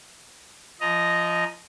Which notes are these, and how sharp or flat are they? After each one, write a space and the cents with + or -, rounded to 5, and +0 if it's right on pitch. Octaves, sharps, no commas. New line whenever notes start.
F3 -20 D#5 +0 A#5 +0